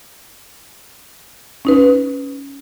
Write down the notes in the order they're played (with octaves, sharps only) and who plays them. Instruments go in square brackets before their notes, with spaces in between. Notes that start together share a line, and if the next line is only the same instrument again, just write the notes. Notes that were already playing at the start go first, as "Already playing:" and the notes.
[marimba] C#4 D#4 B4